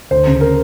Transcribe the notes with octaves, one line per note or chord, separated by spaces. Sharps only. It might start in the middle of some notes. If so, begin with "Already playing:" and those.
D2 C5
C#3
A#4